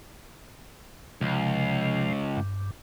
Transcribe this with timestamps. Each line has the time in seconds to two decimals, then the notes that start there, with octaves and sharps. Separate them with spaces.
1.21 C#2 C3 F3
2.37 G2